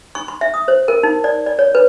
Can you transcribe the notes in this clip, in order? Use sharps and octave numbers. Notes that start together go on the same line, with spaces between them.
C#6
C6
E5
D#6
C5
A#4
D#4
D5
D5
C#5
B4